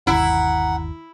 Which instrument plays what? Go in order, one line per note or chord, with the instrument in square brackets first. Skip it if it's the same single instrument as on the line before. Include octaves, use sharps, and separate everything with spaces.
[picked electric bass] G1 D#2 [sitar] E4 [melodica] F#5 [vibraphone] A#5